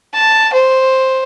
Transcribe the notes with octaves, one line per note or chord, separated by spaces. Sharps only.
A5
C5